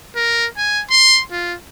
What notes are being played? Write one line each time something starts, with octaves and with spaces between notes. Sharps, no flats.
A#4
G#5
C6
F4